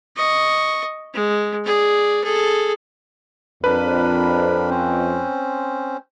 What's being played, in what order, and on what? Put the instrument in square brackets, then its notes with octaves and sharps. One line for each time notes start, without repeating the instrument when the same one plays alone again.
[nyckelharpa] D#5 C#6
G#3
G#4 D5
G#4 A4
[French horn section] F2 [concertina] D4 A#4 B5 [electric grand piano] B4
[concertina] C4 C#4 C5